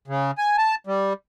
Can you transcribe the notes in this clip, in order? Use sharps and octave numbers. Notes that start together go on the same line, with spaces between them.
C#3
G#5
A5
G3